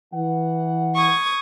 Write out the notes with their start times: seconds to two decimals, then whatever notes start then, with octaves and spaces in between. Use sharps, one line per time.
0.14 E3 F#5
0.94 C#6 D#6 G#6